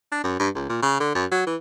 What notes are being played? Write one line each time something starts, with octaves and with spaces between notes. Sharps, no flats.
D4
F#2
G2
C#2
A#2
C#3
D3
F#2
F#3
E3